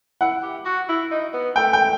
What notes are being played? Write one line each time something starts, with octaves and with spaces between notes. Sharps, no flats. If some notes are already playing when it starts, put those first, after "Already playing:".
E4 F#5
G4
F#4
E4
D#4
B3
A3 G5
G5